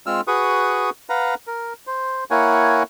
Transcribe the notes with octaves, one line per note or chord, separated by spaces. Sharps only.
G#3 C4 F4 E6 F6
F#4 G#4 B4 C#6 D#6
B4 F5 F#5 A#5
A#4
C5
A#3 E4 A#4 C#5 F#5 G#5